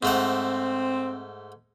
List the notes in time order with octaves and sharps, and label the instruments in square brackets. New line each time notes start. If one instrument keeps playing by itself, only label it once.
[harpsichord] G#2 A3 F#5 [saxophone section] C4